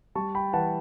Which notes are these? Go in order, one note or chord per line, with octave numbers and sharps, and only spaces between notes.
G3 A5 C#6
G5 B5
E3 F#5 A5